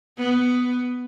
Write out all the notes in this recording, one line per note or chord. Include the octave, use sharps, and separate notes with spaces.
B3